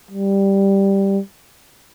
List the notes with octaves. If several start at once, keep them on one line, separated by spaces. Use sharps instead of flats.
G3